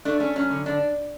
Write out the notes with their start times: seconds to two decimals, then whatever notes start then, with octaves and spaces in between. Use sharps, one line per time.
0.05 A3 D4
0.20 A3 C#4
0.36 F#3 C#4
0.51 D3
0.66 D3 D4